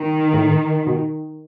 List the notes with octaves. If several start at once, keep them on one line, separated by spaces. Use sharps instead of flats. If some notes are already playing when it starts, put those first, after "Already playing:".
Already playing: D#3
A2
B2